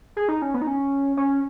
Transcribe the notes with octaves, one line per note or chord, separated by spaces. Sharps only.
G#4
D#4
C#4
B3
D#4
C#4
C#4